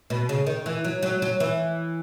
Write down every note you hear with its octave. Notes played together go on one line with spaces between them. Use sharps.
B2
C#3
D#3
E3
F#3
F#3
F#3
E3